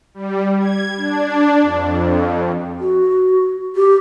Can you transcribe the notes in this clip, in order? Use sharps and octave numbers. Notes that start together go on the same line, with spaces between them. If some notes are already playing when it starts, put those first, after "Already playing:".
G3
G#6
D4
F2
F#4
G4